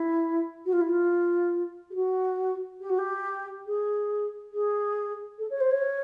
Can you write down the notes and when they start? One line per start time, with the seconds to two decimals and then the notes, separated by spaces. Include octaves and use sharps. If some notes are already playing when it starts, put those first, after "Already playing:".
Already playing: E4
0.65 F#4
0.72 F4
0.81 E4
0.89 F4
1.90 G4
1.94 F#4
2.80 G4
2.89 F#4
2.98 G4
3.66 G#4
4.52 G#4
5.38 A4
5.50 C#5
5.60 C5
5.71 C#5